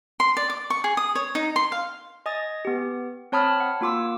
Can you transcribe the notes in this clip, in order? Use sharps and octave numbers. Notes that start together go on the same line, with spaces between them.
C6
D5
D6
C#6
G#4
D#6
C#5
D#4
C6
F5
D#5 G#5 D#6 A6
B3 G4
C4 C#5 A5 B5 D#6 F6
F#5
A#3 F4 D6 E6